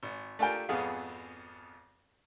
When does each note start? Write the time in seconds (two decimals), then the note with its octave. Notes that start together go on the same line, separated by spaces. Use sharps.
0.03 G#1
0.39 A3 D4 F4 G4 A#4 G5
0.69 G#1 F2 B3 G#4 F5